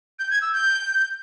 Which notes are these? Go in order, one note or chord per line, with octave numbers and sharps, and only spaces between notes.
G6
G#6
E6
G6